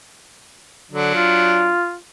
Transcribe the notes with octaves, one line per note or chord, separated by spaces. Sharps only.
D3 F#3 D4
F4